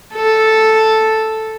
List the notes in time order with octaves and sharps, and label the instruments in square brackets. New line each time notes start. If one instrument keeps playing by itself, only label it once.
[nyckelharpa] A4